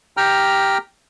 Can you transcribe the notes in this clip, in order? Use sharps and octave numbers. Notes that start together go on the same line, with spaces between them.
G4 G5 A#5 F6